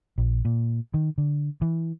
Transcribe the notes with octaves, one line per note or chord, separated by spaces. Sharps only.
A#1
A#2
D#3
D3
E3